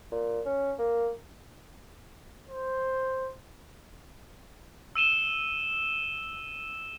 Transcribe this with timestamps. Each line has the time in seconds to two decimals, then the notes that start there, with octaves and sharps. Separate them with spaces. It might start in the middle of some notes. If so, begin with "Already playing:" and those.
0.11 A#2
0.45 C#4
0.78 A#3
2.49 C5
4.95 E6 D#7 E7 G7